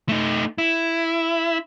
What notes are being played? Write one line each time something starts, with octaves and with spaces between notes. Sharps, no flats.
A3 D#4
E4